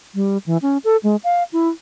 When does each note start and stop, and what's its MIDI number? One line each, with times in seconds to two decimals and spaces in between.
0.15 0.38 55
0.46 0.57 52
0.62 0.78 61
0.84 0.97 69
1.03 1.16 56
1.24 1.43 77
1.53 1.69 64